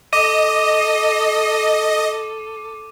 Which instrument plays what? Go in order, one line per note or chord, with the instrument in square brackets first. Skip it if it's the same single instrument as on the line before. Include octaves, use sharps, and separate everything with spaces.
[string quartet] A4 [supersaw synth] D#5 [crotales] D6 D#7